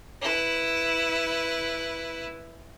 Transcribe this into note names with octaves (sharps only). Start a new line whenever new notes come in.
E4 B4